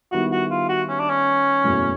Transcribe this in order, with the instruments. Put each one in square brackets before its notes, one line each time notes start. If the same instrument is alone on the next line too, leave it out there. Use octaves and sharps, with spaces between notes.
[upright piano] D#3 G3 B3 E4 [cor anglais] F#4
[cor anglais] F#4
F4
F#4
C#4
D4
C#4
[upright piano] F#1 E2 B2 F#3 A3